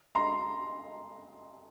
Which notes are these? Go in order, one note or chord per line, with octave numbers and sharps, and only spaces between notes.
A#5 C6